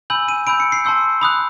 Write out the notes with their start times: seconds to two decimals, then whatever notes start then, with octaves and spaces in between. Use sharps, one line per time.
0.10 G#5 B5 E6 G6 F#7
0.28 D#7
0.47 B5 E6 G6 D7
0.60 C#7
0.72 C7
0.85 A5 C6 E6 G6
1.21 B5 D#6 F#6